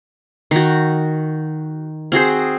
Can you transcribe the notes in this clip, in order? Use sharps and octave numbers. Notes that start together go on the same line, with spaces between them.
D#3 F#4
C4 F#4 G#4 C5